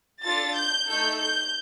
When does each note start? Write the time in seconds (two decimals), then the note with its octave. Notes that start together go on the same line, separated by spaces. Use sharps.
0.23 D4 F4 A4 A6
0.55 G6
0.87 A3 D#4 A4 G6
1.19 G6